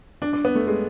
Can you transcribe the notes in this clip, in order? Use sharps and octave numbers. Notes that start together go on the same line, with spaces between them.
D4
D4
B3
A3
G#3